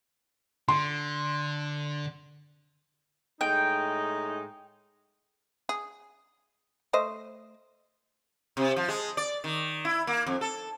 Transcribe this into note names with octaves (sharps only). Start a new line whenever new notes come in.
D3 C6
A2 G#3 D#4 G5
G#4
A3 C5 D#5
C3
F3
G#3
D5
D#3
E4
A#3
F2
A4